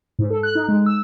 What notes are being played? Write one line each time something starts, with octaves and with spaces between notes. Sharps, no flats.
G#2
A4
F#6
D#4
G#3
E6